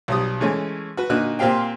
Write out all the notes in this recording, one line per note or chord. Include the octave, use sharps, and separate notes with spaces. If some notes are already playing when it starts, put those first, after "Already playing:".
B1 G3 D#6
E3 G#3 A3 C#4
F#4 B4
A#2 D3 D#4 F#4 F#6
A#2 C4 G4 F5 G5